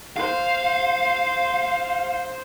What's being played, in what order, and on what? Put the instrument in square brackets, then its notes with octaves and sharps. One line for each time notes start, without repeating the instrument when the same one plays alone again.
[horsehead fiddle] C5 [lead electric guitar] F5